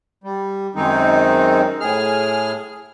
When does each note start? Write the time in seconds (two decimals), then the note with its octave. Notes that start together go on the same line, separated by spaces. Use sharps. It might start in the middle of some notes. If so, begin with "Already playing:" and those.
0.24 G3
0.75 F#2 D#3 G#3 C4 D#4
1.80 A2 G#4 F6